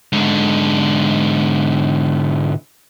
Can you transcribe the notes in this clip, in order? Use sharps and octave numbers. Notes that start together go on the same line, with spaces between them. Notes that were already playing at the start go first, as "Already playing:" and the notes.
G#2 D3